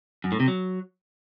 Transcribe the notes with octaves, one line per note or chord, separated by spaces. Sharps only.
F#2
A2
C3
F#3